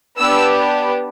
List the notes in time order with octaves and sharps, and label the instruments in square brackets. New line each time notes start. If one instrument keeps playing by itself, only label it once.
[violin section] B3 D4 G4 E6